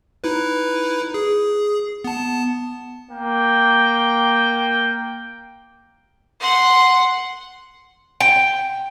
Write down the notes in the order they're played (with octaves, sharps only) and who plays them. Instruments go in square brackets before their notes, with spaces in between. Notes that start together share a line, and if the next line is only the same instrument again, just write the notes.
[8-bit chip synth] D#4 E4 B4
G#4
B3 A5
[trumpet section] A#3 G5
[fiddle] F#5 C6
[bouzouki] G5